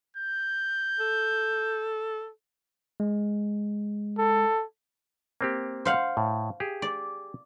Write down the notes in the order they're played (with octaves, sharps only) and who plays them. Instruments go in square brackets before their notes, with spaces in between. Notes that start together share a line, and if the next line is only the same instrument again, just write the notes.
[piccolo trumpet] G6
[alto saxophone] A4
[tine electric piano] G#3
[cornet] A4
[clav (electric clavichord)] A#3 C4 G4
[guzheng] C5 F5 F#5
[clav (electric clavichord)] A2
G4 G#4
[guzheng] D5